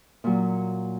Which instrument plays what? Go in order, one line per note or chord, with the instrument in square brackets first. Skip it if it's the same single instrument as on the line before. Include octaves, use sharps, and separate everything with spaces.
[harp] A#2 F#3